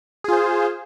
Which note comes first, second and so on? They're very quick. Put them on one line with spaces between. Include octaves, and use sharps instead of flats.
G#4 F4 C5